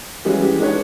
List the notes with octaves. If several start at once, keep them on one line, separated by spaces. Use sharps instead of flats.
E3 G3 G#3 C#4 F#4
G4
G#3 D4 D#4 B4 C#5